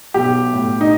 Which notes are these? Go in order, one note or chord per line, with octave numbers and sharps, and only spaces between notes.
B1 G4
A2
D#4